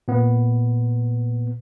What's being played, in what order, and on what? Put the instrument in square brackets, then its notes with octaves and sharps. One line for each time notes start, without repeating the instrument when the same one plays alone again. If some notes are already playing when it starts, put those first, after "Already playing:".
[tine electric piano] A#2 B3